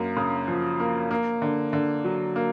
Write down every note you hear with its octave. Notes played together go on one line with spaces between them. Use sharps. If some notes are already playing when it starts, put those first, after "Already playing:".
Already playing: F#2 A#3
C#3
F3
A#3
A#3
D3
D3
F#3
A#3